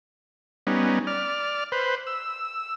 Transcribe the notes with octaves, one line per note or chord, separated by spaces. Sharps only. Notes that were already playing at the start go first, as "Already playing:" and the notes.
G3 B3 C#4 D#4
D5 F6
B4 C5
E6